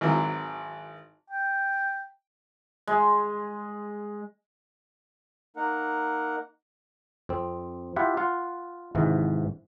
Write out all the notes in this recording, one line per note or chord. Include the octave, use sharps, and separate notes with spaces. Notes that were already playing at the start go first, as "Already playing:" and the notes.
G#1 E3 F#3 C4
G5
G#3
A#3 D#4 A#4 F#5
F2 C4
E4 F4 G4 E5 F#5
F4 F5 F#5
G#1 G#2 C3 E3